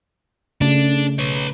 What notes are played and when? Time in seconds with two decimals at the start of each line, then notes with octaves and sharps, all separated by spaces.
0.61 C#3 A3 D4
1.19 B4 C#5